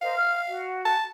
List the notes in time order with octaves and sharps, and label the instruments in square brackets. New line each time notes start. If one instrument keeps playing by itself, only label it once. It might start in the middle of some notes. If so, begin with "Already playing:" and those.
[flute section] A#4 C5 D#5 [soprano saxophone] F5
[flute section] F6
F#4
[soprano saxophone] A5